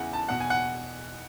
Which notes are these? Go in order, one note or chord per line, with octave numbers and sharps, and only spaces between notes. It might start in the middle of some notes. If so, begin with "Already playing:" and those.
Already playing: E2 C#3 E3 F#5
A5
E2 B2 F#5
G#5
F#5